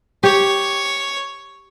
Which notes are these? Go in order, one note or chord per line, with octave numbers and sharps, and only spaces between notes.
G4 C#5